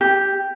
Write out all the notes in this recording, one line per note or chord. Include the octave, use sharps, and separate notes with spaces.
G4